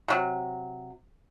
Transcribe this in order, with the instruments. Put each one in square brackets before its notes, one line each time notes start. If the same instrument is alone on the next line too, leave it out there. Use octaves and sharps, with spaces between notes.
[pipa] C3 F#3